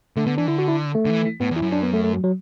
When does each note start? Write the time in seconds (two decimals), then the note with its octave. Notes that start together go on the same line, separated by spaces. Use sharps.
0.16 D3 A3
0.26 D3 B3
0.38 E3 D4
0.47 D3 E4
0.59 F#4
0.68 E4
0.95 A3
1.05 D3
1.10 E3
1.41 A2 B3
1.51 E2
1.56 E4
1.62 F#2
1.73 D4
1.83 B3
1.93 A3
2.04 A3
2.13 F#3
2.24 F#3